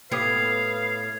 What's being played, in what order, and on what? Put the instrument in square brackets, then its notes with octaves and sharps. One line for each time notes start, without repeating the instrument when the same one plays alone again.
[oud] A2 B3 G4 [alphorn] B4 [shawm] F5 [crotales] D#6 G#6 C7